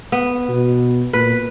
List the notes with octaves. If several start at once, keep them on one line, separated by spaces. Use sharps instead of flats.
B3
B2
A#2 B4